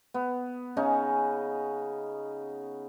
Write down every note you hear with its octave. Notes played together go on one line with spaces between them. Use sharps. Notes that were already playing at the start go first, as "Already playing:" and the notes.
B3
C#3 C#4 D#4